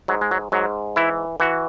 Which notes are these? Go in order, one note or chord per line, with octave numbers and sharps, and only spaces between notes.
G#2 F#3
G#3
F#3
G#2 F#3
E3 E4
E3 F#4